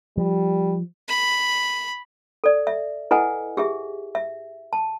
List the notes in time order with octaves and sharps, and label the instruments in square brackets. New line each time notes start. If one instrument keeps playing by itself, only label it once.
[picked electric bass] F3 [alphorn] G3
[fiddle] B5
[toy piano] A4 D5
E5
E4 A4 B4 D#5 F#5 G#5
G4 G#4 E5
E5
A5